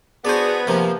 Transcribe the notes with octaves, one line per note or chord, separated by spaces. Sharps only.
B3 D4 F#4 G#4 C5 D5
C3 F3 A#3